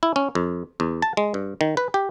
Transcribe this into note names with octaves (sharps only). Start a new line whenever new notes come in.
E4
C#4
F2
E2
A5
G#3
G2
D#3
B4
G4